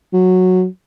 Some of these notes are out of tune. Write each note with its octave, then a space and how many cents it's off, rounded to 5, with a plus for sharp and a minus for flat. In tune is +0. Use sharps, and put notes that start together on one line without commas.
F#3 -10